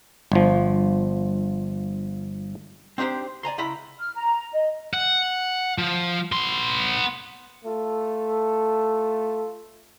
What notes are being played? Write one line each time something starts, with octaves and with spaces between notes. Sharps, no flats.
G1 F3
C4 D4 D#4 G4 C5
D5 G#5 A#5 C6
C#2 E4 A#5 B5
F6
A#5
D#5
F#5
F3
B3 C6
A3 F4 A4